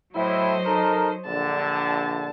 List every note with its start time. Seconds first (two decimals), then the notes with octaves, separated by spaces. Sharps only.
0.15 A2 F#3 E4 C5 D#5
0.66 D#4 A4 A#4
1.26 A#1 D3 A5